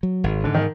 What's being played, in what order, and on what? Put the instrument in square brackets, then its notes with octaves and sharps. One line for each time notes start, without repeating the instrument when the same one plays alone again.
[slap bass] F#3
G#1
[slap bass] G#2 [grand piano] D3
[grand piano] D#3